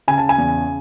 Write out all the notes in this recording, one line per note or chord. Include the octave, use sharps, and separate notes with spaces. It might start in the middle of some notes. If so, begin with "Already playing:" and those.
C#3 G#5
A5
G#5
E2